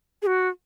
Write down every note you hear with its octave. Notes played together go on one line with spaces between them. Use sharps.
G#4
F#4